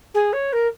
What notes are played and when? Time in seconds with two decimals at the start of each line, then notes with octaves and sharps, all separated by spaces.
0.14 G#4
0.32 C#5
0.52 A#4